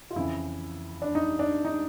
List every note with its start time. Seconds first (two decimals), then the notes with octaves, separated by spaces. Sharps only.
0.11 F4
0.16 F2 C#3 E3 E4
1.02 D4
1.15 D#4
1.39 D4
1.65 D#4